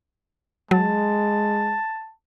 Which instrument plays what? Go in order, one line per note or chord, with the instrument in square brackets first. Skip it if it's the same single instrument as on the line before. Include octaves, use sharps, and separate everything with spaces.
[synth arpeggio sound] F#3 [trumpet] G#3 [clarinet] A5